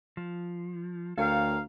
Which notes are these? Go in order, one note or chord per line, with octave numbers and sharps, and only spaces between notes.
F3
D2 A4 A#4 C#5 F5 G5